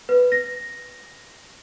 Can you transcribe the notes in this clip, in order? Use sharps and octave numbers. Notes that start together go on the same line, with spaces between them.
B4
A#6